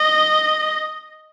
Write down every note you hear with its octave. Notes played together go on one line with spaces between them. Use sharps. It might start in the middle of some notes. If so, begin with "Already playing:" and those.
Already playing: D#5